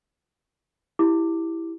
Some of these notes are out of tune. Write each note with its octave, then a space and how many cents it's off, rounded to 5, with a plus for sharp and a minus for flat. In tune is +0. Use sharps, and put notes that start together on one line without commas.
E4 +0 G4 +5 D6 +0